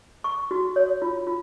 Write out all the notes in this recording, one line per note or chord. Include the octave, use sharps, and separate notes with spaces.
C#6
F#4
C#5
F4
F4